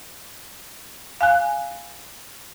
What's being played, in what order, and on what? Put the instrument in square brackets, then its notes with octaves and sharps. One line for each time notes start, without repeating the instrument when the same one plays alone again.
[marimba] F5 G#5 F#6